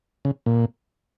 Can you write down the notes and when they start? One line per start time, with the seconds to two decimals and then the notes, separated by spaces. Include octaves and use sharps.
0.25 C#3
0.46 A#2